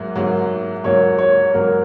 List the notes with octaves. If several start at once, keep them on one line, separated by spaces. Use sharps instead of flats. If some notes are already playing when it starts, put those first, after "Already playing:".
Already playing: G#2 F#3 A#3 E5
G#2 F#3 A#3
G#2 F#3 A#3 C#5
C#5
G#2 F#3 A#3 A#4